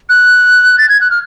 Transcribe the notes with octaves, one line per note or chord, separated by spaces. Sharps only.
F#6
A6
G#6
F#6
F6